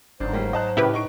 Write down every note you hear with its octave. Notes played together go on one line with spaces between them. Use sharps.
G1 G#2 F#3 D4 C5
G3 G#3 A#3
D#5 A5 F#6
A2 C#3 E4 G4 B4
D#4 C#6 D7